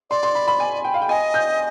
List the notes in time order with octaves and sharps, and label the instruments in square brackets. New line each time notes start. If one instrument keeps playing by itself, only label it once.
[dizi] D5 [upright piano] C6
[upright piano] C6
B5
B5
G#5
G5
F5
G5
[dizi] D#5 [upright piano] G#5
[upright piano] G6